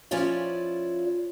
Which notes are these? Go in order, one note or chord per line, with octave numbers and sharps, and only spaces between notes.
F3 C#4 E4 F4 C#5 D5